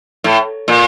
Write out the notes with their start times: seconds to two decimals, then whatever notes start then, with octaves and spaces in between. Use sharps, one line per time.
0.24 A2
0.68 A#2